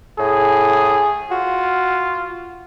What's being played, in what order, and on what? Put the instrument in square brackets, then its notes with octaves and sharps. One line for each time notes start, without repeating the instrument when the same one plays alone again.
[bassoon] A2 [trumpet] G#4
[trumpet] F4 [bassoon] F#4